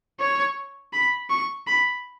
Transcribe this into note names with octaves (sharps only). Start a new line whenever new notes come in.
C#5
B5
C#6
B5